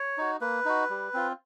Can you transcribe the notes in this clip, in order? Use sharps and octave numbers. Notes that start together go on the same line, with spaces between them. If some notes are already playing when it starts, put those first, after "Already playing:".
Already playing: C#5
D#4 F#4
A#3 B4
D#4 F#4
G3
C4 F4